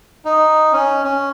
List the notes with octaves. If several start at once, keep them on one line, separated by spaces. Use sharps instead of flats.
D#4
C#4
C#4